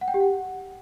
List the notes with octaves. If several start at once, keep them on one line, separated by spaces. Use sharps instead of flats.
F#5
G5
G4
F#5